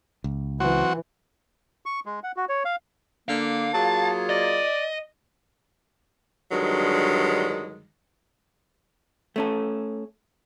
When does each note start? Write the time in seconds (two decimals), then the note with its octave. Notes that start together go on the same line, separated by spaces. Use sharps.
0.24 C#2
0.60 E3 F#3 C4 F#4
1.86 C#6
2.06 G#3
2.24 F#5
2.37 F#4
2.49 C#5
2.65 F5
3.29 D3 A#3 F5
3.74 F#3 A#3 F4 G#4 A5
4.29 D5 D#5
6.51 G2 D3 D#3 F#3 G#3
9.36 A3 C#4 A4